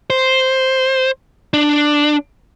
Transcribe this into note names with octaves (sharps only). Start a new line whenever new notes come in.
C5
D4